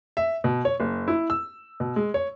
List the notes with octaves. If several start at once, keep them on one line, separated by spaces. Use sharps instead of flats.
E5
B2
C#5
F#1
E4
E6
B2
G#3
C#5